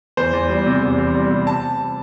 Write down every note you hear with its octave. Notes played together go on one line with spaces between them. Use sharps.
E2 C5
E2
G3
C3
E2
E2
G3
C3
A5